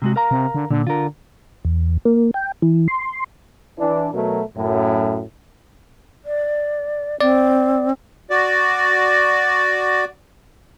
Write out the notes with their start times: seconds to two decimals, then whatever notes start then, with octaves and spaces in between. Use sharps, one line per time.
0.02 C3 G#3 F#4
0.16 A#4 F5 A#5
0.31 C3
0.55 D3
0.71 A#2 D3
0.87 D3 F4 A#4
1.65 E2
2.05 A#3
2.34 G5
2.62 E3
2.88 C6
3.78 E3 D4
4.13 B2 F#3 A3 A#4
4.57 F#2 A2
6.25 D5
7.21 C4 D5
8.30 F#4 D5